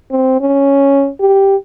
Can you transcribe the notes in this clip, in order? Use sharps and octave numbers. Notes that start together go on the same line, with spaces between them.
C4
C#4
G4